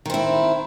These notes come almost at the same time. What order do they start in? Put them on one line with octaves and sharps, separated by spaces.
D#3 C4 E4